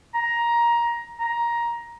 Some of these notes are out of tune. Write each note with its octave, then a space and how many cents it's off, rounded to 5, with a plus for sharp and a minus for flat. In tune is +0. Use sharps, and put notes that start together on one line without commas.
A#5 +15
A#5 +15